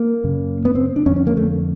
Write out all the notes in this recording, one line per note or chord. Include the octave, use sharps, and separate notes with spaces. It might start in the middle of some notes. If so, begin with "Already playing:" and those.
Already playing: A#3
F#2 C#3
B3
C4
D4
F2 D3 C#4
C#4
A#3
A3